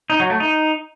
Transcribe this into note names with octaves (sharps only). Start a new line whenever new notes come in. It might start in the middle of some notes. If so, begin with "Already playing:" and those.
D#4
F#3
A3
D#4